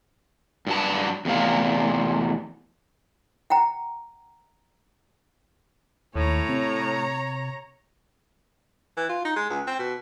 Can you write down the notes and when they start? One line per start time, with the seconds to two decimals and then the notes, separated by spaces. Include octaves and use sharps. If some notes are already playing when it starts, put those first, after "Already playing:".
0.67 G2 F#3 A5
1.25 E2 A2 C3 F5
3.50 F#5 G5 A#5
6.15 D#2 A2 C#5 A#5
6.49 C3
8.97 E3
9.09 F4
9.25 D#4
9.36 G#3
9.50 C#2
9.67 C4
9.79 B2